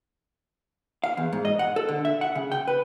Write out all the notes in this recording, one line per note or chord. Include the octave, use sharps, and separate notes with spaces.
F5
E2
G#2
D#5
F#5
A4
D3
E5
F#5
C#3
G5
B4